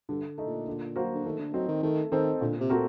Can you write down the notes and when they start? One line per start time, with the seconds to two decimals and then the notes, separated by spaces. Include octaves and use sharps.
0.09 G2 D3
0.38 A3 D#4
0.47 A#2
0.68 D3
0.96 F#3 A#3 F#4 C5
1.15 D3
1.25 D#3 A3
1.39 D3
1.54 F#3 C4 D#4
1.68 D#3
1.83 D#3 A3
2.12 D#3 C4 D#4 A4 C5
2.41 A#2 D3
2.60 C3
2.70 A3 C4 F#4 A#4